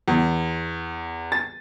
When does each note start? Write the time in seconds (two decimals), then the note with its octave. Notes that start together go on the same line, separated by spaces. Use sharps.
0.08 E2
1.32 A6